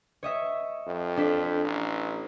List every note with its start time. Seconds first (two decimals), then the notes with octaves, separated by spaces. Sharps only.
0.23 C#5 D#5 E5
0.87 F2
1.17 D4 A4 B6
1.65 A1